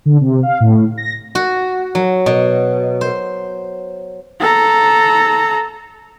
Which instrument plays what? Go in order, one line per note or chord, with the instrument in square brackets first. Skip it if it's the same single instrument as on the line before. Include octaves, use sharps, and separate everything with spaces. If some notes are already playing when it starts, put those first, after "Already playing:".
[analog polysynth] D3
C3
F5
A2
A#6
[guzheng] F#4
F#3
B2
C5
[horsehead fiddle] A4 A#5